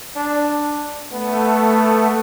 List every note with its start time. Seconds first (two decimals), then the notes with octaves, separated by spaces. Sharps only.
0.16 D4
1.12 A3 B3